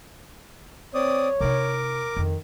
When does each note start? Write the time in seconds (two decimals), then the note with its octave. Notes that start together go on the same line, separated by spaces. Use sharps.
0.94 C4 C#5 D5 D#6
1.41 C3 D#4 A#4 D6
2.17 F2 D#3